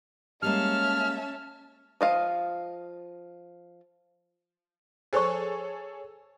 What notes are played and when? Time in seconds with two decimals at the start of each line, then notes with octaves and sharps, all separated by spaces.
0.43 G3 G#3 A#3 C#4 E5 A5 F6
2.01 F3 D#5 F5
5.13 G#4 A4 C5 C#5 C#6